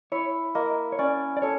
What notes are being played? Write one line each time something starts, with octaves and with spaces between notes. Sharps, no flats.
E4 C#5
A#3 D#5
C#5
C#4 D5
D5
A4 C#5